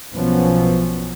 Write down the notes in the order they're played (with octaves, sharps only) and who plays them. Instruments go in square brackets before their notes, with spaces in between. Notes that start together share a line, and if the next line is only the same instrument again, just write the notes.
[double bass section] B1 B2 F3 F#3 B3 C#4